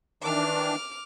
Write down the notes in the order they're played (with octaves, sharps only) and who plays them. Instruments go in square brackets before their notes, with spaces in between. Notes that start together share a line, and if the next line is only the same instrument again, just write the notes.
[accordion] D#3 E3 D4 [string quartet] D6 F6